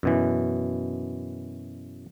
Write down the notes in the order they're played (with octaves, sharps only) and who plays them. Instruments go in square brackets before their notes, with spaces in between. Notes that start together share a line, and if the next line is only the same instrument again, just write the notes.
[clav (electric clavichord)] F#2 B2 E3